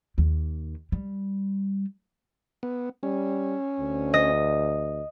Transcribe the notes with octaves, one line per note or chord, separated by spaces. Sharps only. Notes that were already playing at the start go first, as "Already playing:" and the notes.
D#2
G3
B3
G3 C#4
D2
D#5